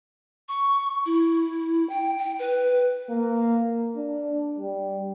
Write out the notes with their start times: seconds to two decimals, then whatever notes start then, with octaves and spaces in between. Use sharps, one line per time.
0.49 C#6
1.06 E4
1.90 G5
2.19 G5
2.39 B4
3.09 A#3
3.96 D4
4.58 G3